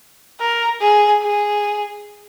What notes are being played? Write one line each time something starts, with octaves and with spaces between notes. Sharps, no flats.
A#4
G#4
G#4